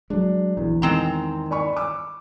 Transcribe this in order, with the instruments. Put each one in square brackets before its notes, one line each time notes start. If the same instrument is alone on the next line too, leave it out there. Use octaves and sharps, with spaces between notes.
[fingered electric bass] F#3 G#3 [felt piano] D4
[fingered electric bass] A#1 [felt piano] E2
[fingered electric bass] D#3 [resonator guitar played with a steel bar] G#3 C4 A#5
[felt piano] D5 B5 C#6
D6 E6